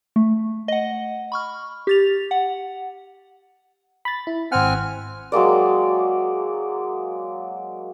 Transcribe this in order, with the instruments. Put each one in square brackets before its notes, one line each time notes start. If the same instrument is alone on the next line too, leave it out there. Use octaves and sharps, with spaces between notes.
[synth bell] A3
D#5 F#5
B5 C#6 F6
G4 A6 F7
F#5
[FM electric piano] B5 A6
E4
[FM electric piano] G#1 F#5 [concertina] C4 G#5 F6
[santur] F#3 G#3 A#3 D5